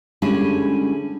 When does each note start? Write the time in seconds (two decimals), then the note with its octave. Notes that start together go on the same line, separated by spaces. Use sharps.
0.22 D3 G3 G#3 C#4 E4 G#4